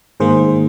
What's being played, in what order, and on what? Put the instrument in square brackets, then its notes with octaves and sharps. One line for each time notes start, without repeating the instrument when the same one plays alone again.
[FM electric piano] G#2 D#3 A#3 G#4 C5